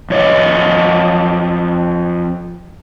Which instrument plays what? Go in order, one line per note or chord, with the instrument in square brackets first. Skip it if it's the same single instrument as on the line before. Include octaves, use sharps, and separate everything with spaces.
[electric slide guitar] F2 C#5 D#5